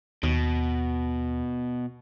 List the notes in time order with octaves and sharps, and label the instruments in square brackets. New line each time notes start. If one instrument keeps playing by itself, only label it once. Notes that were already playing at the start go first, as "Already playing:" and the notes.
[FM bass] D#2 [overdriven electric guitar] B2